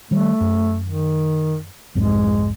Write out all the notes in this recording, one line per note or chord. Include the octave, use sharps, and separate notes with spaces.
D#3 G3 A3
F#2
D#3
B1 F2 G#2 G#3